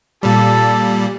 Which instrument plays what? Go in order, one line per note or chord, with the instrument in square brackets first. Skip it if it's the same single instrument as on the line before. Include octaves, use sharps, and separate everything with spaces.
[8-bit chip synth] A#2 G3 [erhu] A4